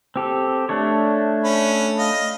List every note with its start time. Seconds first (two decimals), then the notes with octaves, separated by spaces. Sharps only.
0.16 C4 G4 A4
0.69 A3 D4 C#5
1.44 C#4 B5
1.99 D#5 F5